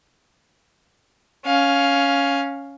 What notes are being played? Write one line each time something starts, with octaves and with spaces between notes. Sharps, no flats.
C#4 F5